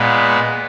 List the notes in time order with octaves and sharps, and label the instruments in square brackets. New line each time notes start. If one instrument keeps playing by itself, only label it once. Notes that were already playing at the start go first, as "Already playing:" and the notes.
Already playing: [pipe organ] A#2 G#3 B3